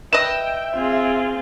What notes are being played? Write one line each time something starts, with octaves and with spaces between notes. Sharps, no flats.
B4 D#5 E5 G5 E7
C4 F4 G#4